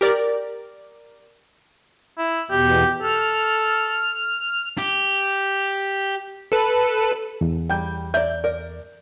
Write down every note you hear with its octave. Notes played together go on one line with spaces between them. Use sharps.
G4 A#4 D5
E4
E2 B2 G4
A4 F6
G4
A4 B4
E2
G3 G5 G6
D5 E5 G6
A#4 D5